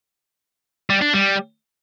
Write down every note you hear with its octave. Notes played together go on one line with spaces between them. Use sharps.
G3
D4
G3